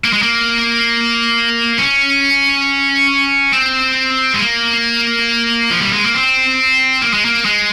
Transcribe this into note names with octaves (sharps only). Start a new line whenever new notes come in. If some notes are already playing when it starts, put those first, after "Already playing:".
A#3
G#3
A#3
C#4
C4
G#3
A#3
F3
G3
G#3
A#3
C4
A#3
G#3
A#3
G#3